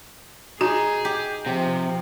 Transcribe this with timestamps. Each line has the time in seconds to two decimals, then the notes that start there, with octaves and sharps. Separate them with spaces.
0.61 D#4 F#4 G#4
1.05 G4
1.46 C3 F3